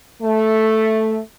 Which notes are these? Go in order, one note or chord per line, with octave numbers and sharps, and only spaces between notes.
A3